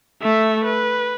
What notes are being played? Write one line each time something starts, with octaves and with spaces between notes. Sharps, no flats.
A3 E5
B4